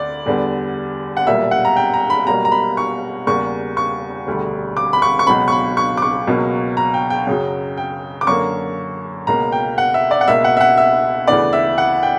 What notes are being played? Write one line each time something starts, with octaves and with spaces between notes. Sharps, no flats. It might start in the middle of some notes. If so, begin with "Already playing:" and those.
Already playing: D2 D3 D5
E2 D3 G3 B3
F#5
B1 A#2 G3 A#3 E5
F#5
A#5
G5
A#5
B5
B1 B2 G3 A#3 A#5
A#5
B5
C#6
E2 C#3 G3 A#3 C#6
C#6
E1 D2 D3 G3
D6
B5
C#6
C#6
C#2 B2 F#3 B3 B5
C#6
B5
C#6
D6
C#6
C#2 B2 F#3 A#3
A#5
G5
G5
F#2 C#3 F#3
G5
D6
F#2 D3 A#3 C#6
C#2 B2 A#3 A#5
G5
F#5
E5
D5
F#5
C#2 B2 A#3 E5
F#5
E5
F#5
E5
D2 C#3 E3 B3 D5
E5
F#5
G5